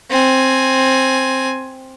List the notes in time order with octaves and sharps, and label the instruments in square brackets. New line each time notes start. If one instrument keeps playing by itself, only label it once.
[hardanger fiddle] C4 G#5